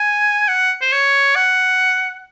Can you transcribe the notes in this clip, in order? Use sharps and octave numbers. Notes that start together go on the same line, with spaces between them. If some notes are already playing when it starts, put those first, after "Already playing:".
Already playing: G#5
F#5
C5
C#5
F#5